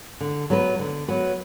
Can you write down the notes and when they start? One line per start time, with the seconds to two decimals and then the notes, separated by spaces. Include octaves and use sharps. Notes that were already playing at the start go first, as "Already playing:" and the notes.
0.20 D3
0.50 F#3 B3 F#4 B4
0.79 D3
1.08 F#3 B3 F#4 B4